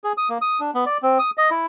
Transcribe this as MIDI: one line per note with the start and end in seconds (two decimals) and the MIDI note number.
0.04 0.13 68
0.17 0.29 87
0.29 0.38 58
0.42 0.60 87
0.60 0.71 62
0.74 0.84 59
0.86 0.98 74
1.03 1.18 60
1.19 1.30 87
1.38 1.50 75
1.51 1.66 64